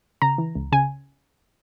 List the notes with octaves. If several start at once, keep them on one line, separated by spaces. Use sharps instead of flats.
C#3 A#5
E3
C#2
C#3 G#5